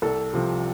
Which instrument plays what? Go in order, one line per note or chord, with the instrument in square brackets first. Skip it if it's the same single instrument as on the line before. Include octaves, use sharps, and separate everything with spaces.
[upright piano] C2 A4
C3 F3